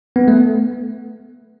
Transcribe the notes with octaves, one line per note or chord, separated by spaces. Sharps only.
B3
A3